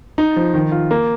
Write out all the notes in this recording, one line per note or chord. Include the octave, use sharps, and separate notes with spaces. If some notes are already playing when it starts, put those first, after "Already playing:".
D#4
F3
D#3
F4
A#3